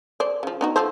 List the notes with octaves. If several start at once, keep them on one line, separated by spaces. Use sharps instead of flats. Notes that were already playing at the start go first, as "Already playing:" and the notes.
C5 D5
C#3 F3
B3 D#4 F#4
F3 A4 C5